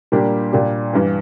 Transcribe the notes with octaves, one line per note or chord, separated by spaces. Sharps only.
A#2 G3 A#3 D4 G4
A#2 G3 D4 G4
G2 E3